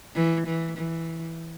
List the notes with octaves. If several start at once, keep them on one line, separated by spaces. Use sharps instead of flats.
E3
E3
E3